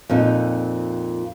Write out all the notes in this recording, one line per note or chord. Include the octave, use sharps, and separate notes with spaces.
F2 A#2 C4 D#4